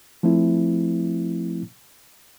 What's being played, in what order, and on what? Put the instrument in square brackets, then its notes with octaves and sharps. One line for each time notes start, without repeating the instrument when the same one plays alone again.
[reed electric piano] F3 A3 C4 E4